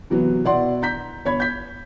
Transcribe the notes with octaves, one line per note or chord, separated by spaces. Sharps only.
C3 E3 F#3 B3
B2 E4 D5 F#5 C6
A#5 G6 B6
G1 C#5 B5 G#6
G6 B6